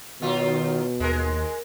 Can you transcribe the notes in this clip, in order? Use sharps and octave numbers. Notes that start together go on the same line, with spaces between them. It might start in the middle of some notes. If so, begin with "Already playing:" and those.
B2 D#3 F#3 F4
D#2 G#3 A#4